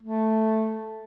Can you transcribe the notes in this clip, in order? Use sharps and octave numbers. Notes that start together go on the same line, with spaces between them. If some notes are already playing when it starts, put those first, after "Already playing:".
A3